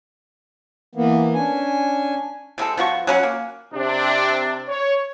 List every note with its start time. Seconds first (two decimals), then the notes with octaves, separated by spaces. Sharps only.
0.95 E3 A#3 B3
1.34 C#4 D4 G#5
2.58 C3 G#3 C4 A4
2.77 F3 B3 F#4 C#6
3.07 F#3 C#4 A#4 F#5
3.23 A#3
3.74 C3 D4
4.68 C#5